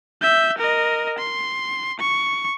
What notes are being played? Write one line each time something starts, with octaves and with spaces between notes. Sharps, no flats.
E5 G6
A#4 D#5
C6
C#6